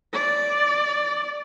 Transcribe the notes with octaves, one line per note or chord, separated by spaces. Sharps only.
D5